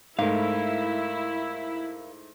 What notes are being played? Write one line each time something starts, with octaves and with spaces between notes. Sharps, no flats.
G#2 A3 E4 A#4 F5